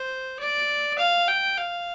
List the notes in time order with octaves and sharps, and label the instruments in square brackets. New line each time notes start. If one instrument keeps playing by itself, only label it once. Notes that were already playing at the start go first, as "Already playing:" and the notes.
Already playing: [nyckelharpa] C5
D5
F5
G5
F5